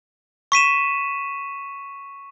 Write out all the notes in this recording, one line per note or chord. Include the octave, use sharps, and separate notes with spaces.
C#6 B6 D#7 E7